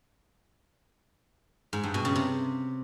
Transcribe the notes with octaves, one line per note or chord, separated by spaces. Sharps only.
G#2
G2
B2
C#3
C3